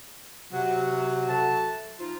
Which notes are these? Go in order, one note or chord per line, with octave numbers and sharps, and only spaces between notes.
C3 F#3
A4 E5 A5
F3 D#4 F4